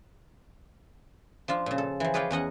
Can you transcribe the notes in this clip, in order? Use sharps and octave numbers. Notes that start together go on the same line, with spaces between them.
F3 D4 F4
A#2 C#3
A4
E3 F3
G#4 B4 C#5 D5 F5 G5
E2 C#4 D#5 F#5